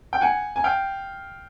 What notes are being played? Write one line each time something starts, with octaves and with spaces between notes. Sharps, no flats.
G5
F#5 G#5
G#5
F5 G5